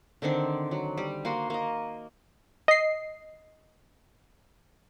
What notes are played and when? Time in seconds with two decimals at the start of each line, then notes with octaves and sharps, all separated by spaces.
0.22 D3 D#3 C4 D4
0.71 F#3
0.98 G3
1.25 A#3 F#4 C6
1.50 A#3 D#5
2.68 D#5 C7